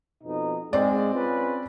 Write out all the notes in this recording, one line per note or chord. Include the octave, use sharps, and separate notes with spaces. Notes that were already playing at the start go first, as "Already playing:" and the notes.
F2 B2 D#4
G#2 G#3 C4 D5
C#4 F4 B4